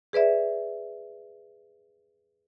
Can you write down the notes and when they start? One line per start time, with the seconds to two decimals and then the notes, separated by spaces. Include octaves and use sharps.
0.13 G#4 B4 D5 E5